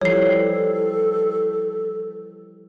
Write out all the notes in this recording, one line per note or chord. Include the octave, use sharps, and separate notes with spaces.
E3 F3 G3 A4 C#5 C7